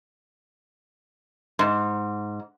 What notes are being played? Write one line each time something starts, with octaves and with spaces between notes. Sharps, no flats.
G#2